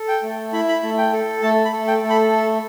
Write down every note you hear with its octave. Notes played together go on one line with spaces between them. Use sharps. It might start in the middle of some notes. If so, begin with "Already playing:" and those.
Already playing: A4
G5
A3
E4 B5
B5
A3
G5
A4
A3 A5
B5
A4
G5
A3
B5